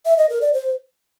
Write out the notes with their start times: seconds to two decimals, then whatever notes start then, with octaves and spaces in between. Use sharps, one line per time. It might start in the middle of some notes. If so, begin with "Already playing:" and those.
0.06 E5
0.18 D#5
0.29 A#4
0.41 D5
0.53 C5